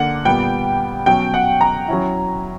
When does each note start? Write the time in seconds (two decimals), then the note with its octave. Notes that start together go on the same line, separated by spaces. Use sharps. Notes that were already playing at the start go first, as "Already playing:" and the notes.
Already playing: D3 A#3 D4 F#5
0.25 A#2 G3 B3 G5
1.06 B2 F#3 C#4 G5
1.34 F#5
1.61 A#5
1.88 F#3 C#4 E4